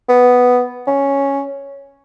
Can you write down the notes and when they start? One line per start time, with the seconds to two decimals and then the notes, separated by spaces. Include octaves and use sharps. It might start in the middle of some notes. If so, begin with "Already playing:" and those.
0.09 B3
0.87 C#4